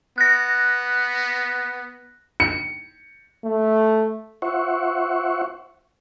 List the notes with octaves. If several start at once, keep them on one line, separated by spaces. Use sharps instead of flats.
B3 F#6 A#6
C#7
A3
F4 C5 E5 F#5 C#6